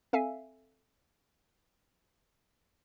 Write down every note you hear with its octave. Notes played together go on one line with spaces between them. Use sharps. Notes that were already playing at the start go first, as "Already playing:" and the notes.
C4 A4 E5 F5 G#5